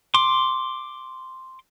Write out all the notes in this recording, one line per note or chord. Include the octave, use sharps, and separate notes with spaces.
C6 D6